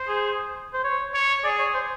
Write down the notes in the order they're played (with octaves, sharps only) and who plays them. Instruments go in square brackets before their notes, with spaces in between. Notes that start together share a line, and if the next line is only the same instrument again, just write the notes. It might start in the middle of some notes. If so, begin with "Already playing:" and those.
Already playing: [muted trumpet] C5
[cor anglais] G#4
C5
C#5
[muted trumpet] C#5
[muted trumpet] G#4 [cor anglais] D5
[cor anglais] C#5
C5